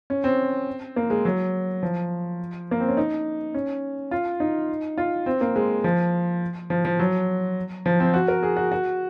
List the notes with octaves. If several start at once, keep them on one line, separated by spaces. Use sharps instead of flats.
C#4
C4
A#3
G#3
F#3
F3
A#3
C4
C#4
D#4
C#4
F4
D#4
F4
C4
A#3
G#3
F3
F3
F3
F#3
F3
C4
F#4
A#4
G#4
F#4
F#4